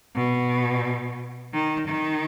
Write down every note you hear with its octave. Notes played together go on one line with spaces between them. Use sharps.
B2
D#3
D#3